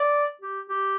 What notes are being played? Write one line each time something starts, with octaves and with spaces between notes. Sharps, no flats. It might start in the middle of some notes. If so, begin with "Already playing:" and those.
Already playing: D5
G4
G4